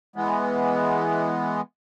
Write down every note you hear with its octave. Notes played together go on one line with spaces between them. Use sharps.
E3 G#3 B3